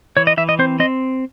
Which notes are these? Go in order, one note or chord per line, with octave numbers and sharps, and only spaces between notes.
E3 C#5
D#5
E3 E5
D#5
C4 C5
C4 D#5